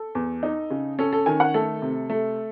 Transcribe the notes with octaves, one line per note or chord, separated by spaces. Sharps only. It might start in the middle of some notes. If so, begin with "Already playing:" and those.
Already playing: A4
E2
D#4
C#3
C#4 A4
A4
D#3 G#5
F#5
A3 A4
C3
A3